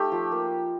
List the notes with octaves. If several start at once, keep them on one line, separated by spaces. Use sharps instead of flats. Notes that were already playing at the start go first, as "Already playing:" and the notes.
Already playing: A3 D#4 G4
F3
A#3